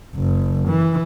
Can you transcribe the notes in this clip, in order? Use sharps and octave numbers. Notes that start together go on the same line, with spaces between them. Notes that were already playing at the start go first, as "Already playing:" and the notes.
F#1
E3